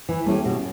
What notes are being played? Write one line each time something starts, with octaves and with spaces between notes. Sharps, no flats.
E3
A3 C#4 E4 G4
B2